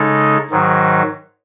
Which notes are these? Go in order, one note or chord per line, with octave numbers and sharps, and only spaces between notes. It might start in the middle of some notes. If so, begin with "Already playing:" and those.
Already playing: C#3 G#3 D#4 A4
G#2 D#3 F#3